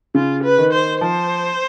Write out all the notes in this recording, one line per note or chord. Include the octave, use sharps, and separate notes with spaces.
C#3 F4
B4
D#3
C5
F3 C5